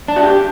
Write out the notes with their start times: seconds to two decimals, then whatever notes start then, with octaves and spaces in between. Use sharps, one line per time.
0.08 D4
0.16 F#4
0.23 G4